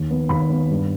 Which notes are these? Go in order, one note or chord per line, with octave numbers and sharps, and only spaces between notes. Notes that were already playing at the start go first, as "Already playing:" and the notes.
Already playing: D#2
B3
D#2 B5
B3
G2